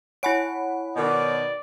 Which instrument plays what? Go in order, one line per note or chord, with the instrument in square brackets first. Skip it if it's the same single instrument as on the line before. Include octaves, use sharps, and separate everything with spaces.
[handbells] E4 G#5 D7 [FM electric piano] C#5 F#5 B5
[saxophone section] B2 D#3 [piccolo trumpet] D5